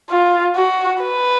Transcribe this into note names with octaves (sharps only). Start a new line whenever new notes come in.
F4
F#4
B4